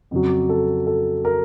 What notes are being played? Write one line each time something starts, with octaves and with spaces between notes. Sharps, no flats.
F2 C#3 F#3
A4
A4
A#4